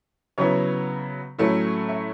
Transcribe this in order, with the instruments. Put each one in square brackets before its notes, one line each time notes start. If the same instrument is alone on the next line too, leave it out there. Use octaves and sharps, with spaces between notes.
[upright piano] C#3 F#3 B3 E4 C#5
A2 F#3 A3 C#4 E4
E5